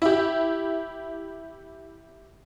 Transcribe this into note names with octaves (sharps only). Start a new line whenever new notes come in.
E4 G4